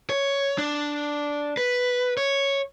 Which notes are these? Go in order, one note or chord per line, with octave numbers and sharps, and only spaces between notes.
C#5
D4
B4
C#5